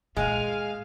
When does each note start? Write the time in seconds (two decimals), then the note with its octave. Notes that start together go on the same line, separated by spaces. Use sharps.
0.17 A#2 G#3 F5 G#5 F6